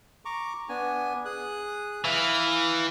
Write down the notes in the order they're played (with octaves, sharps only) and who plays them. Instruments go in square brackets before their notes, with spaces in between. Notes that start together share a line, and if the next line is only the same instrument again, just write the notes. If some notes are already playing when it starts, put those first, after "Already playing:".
[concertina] A#5 C#6 D6
B3 D4 G#5
G#4 D#6 F#6
[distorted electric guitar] E3 [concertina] F5